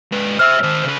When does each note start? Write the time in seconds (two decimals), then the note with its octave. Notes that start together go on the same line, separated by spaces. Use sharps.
0.12 G#2 B4
0.39 C5 E5 E6 F6
0.63 D#3 C5
0.84 C#2 B4